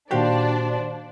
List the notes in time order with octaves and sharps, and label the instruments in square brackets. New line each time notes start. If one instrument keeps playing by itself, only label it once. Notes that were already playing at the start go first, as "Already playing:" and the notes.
[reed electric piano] A#2 D#3 F#4 [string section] D4 D5 [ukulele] G4 F5 [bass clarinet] C5